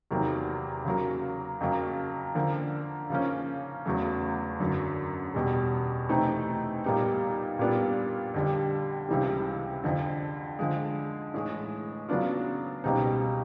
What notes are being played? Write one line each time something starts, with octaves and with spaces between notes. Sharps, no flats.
E2 C3 D#3 F#3 A#3
C#3 F#3 A#3
F2 C#3 F#3 A#3
D3 F3 A#3
C#3 F3 A#3 C#4
E2 C#3 F#3 A3
F#2 D3 F#3
E2 B2 G3
C3 E3 A3 C4 D#4
A#2 G3 B3 D#4
A#2 G3 B3 D4 F4
F2 D3 G3
C#2 C3 E3 G3
F2 D3 F3
D3 F3 G#3
A2 E3 G#3
C#3 F#3 B3 D4 F4
C#2 B2 G3 C4 D#4